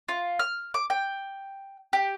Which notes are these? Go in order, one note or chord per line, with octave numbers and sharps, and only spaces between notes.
F4
F6
D6
G5
G4